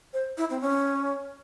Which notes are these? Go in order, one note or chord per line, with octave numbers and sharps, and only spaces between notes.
C5
E4
C4
C#4